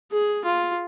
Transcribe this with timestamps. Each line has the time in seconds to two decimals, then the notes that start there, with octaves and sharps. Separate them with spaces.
0.13 G#4
0.45 F4